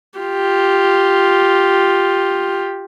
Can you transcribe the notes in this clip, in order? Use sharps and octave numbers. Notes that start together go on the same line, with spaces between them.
F4 G4